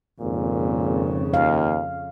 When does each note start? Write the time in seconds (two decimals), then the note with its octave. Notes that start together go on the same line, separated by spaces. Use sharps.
0.21 G#1 F2 A#2 C#3
1.34 D#2 F5